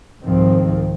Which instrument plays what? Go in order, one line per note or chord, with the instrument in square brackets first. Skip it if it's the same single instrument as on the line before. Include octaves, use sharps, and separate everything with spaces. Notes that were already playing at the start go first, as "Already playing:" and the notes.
[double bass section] C2 G#2 D#3 F3 C4